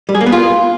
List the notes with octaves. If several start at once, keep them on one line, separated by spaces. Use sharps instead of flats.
G3
G#4
A#3
B3
F4